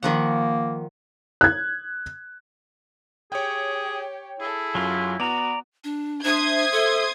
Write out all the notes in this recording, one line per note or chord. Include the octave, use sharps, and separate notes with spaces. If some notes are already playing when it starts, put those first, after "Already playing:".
D#3 F3 A#3 F#5
F#6 G#6
G4 G#4 C#5 G5
E4 G#4 A4
F#2 F#3 F4 G#5
B3 F#4 D5 A#5
D4
D4 C5 E5 C6 D#6 G#6
A4